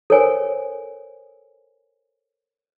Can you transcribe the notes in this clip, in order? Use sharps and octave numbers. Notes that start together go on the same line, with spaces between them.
A4 A#4 C5 C#5 G#5